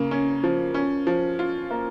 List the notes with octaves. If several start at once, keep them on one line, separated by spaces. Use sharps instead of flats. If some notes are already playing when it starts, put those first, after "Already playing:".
Already playing: C#3 A#3
C#4
F3
C#4
F3
F4
A#3